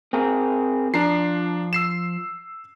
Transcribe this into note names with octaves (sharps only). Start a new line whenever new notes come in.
C4 G#4 A#4
F3 D4 A#5 C7
E6 C7 E7